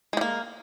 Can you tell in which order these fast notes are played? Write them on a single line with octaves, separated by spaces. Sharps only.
G#3 G3 A#3